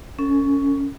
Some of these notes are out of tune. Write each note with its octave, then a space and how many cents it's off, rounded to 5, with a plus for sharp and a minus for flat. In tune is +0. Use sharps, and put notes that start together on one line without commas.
C#4 +10 A4 +40